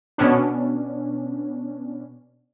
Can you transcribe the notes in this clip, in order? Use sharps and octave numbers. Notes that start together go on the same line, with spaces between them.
B2 B3 C#4 D4